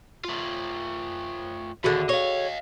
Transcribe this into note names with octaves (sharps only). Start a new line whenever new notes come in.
A3 F4
D#2 D3 F#4 G#4 A4 E5
C#5 D#5 F5